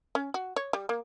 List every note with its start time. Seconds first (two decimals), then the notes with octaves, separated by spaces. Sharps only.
0.15 C#4
0.34 F#4
0.56 C#5
0.73 G3
0.89 A#3